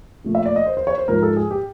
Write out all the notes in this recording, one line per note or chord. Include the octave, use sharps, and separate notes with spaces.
A#2 F3 A3
E5
D5
D#5
C5
C5
C#5
C5
G#2 F3 G#3 A#4
A4
G#4
G4